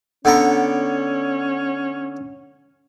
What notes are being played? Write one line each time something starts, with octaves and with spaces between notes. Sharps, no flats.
D3 B3 C#4 A#5